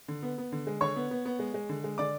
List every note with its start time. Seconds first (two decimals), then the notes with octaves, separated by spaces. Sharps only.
0.08 D3
0.22 B3
0.38 B3
0.52 D3
0.67 G#3
0.81 D3 C#5 C#6
0.96 B3
1.11 B3
1.25 B3
1.39 G#3
1.54 G#3
1.69 D3
1.84 G#3
1.98 D3 D5 D6